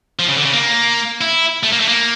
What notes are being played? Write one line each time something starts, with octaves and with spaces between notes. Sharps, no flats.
F3
C#3
D3
C#3
A#3
E4
A3
A#3
A3
A#3